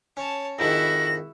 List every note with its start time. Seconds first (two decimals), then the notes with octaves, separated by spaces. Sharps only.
0.17 C#4 C#5 A5
0.59 F2 G#2 D#3 E4 F#4 A#6